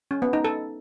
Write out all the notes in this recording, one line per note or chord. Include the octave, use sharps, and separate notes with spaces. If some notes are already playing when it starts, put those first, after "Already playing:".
C#4
B3
D#4
A4